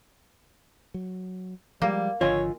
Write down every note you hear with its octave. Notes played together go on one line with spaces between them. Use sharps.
F#3
F3 G3 G#3 A#3
G#1 D3 F3 F4 C#5 D#5 G#5